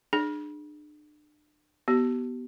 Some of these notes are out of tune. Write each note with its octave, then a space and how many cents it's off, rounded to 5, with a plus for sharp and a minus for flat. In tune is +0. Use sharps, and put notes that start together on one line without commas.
D4 +35 G#4 +10
B3 +0 G4 -40